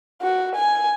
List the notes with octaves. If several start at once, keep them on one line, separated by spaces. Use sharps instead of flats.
F#4
G#5